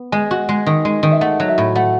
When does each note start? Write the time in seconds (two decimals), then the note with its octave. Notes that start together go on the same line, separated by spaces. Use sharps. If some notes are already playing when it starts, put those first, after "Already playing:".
Already playing: B3
0.12 G#3 G#5
0.31 F#4
0.49 G#3
0.66 D#3
0.85 G#3
1.03 D#3
1.11 E5
1.21 A3 F#5
1.40 F#3
1.48 E5
1.58 A2
1.75 A3 F#5